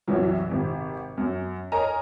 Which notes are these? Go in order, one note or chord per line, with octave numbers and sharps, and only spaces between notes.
C2 F#2 E3 F#3
G#1 C3
F#2
A#4 C#5 D#5 G#5 A#5